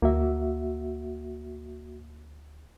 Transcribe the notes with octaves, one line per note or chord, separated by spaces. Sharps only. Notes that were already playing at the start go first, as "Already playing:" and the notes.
D2 A#3 F#4 E5